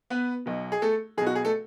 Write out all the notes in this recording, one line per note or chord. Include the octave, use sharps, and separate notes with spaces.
B3 B4
B1 B2
G#4
A3 A4
B1 B2 G#4
F#4
G#4
A3 A4